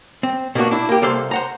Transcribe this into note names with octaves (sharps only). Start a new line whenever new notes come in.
C4
B2 A#3 D4 F#4
D4 E4
A#3 G4
C2 A#3 A4 C5 C6
C5 F#5 A#5